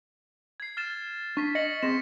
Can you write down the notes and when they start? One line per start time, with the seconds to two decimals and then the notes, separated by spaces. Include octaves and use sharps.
0.60 G#6 C7
0.77 F6 A6 E7
1.37 D4 C#6 B6
1.55 D#5 A#6 C#7 F#7
1.83 C4 G#4 A#6 E7